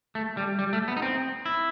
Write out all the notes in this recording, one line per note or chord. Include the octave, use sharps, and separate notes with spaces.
A3
G3
G3
A3
B3
D#4
C4
E4